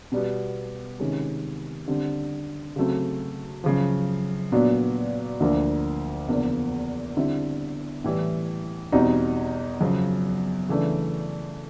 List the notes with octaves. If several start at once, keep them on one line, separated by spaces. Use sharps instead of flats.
B2 G3 B3
C3 D#3 G#3 C#4
D3 G3 C4
C#3 F#3 A3 C4
F#2 C#3 F3
A#2 F#3 B3 D4
D2 D3 F3 A#3
E2 C#3 F3 A#3 D4
D3 G3 C4 E4
A2 E3 G3
E2 B2 G3 C4 D#4
F#2 C#3 F3
C#3 E3 A3 D4